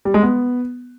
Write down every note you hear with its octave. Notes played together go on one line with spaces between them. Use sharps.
G3
G#3
B3